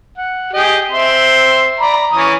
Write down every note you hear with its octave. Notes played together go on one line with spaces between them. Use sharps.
F#5
G4 G#4 D#5
C4 E5 C6
D5 A#5 B5
E3 C#4 D#6